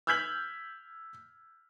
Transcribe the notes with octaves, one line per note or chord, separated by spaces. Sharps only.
E6 F6 G6 G#6 B6 F#7